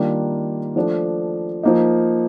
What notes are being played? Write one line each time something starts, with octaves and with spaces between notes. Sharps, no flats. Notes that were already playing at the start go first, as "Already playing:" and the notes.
Already playing: D#3 G3 A#3 D4 F4
F3 A3 D4
F3 A#3 D#4